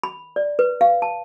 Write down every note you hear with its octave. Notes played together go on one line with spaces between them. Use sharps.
B5
D5
B4
F5
A5